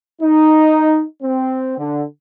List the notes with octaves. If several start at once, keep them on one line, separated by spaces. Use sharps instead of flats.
D#4
C4
D3